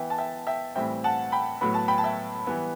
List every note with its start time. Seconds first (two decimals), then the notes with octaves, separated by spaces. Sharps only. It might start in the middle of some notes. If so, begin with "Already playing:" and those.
Already playing: E3 B3 E5 G5
0.10 A5
0.18 E5 G5
0.47 E5 G5
0.75 A2 E3 G3 C4 E5 G5
1.04 F#5 A5
1.32 G5 B5
1.61 A2 F#3 B3 B5
1.74 A5
1.88 G5 B5
1.98 A5
2.04 E5 G5
2.47 E3 G3 B3